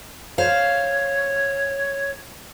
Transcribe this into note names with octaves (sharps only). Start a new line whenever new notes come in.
C5 C#5 F5